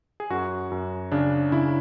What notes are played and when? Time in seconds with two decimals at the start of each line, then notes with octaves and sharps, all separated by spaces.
0.20 G#4
0.30 F#2 F#4
0.72 F#2
1.12 C#3 D4
1.52 C#3 E4